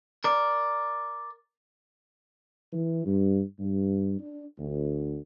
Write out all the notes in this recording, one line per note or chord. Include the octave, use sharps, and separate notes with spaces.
A#4 D5
E3
G2
G2
D4
D2